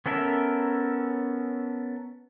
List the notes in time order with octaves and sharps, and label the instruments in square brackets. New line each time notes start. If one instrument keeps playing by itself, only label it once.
[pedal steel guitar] B3 C#4 A4 A#4 E5